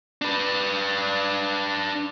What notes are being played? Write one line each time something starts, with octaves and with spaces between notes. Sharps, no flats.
D4 B4